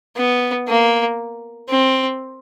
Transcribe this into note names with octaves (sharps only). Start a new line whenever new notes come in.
B3
A#3
C4